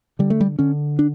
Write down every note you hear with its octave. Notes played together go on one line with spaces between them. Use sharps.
D3 G3
A3
G3
D3 C#4
D4